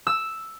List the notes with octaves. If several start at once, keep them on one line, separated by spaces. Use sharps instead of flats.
E6